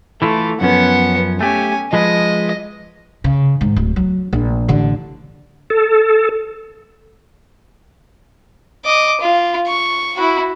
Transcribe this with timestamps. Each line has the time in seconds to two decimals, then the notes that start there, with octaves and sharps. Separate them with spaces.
0.22 E3 A3 E4 F4
0.61 F#2 F3 B3 C#4 F#5
1.41 A3 C#4 G4 G#5
1.93 F3 G#3 B4 D#5
3.24 C#3
3.61 G#2 D#3
3.76 D1
3.96 F#3
4.33 A#1
4.68 A1 D3
5.70 A4
8.85 D#5 D6
9.21 F4
9.67 C#6
10.16 E4 F#4